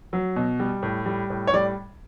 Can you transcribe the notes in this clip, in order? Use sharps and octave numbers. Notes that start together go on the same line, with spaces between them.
F#3
B2
G3
A2
G3
A2
C#5
G3 D5